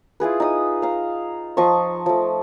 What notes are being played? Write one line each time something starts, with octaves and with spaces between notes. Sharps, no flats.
E4 F4 G#4 B4
D#4 D#6
F5 A#5
F3 D#5 C#6
F3 A3